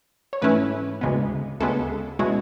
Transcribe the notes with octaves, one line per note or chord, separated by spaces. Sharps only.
C#5
G#2 E3 A3 C#4 E4 B4
D2 C#3 G#3 B3
D2 C#3 G#3 B3 A4
B2 G#3 C#4 E4 F#4